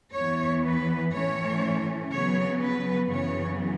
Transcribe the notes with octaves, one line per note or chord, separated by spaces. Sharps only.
E2 E3 B3 C#5
B4
A2 E3 A3 C#4 C#5
C#3 F#3 B3 C#5
B4
F#2 C#3 E3 B3 C#5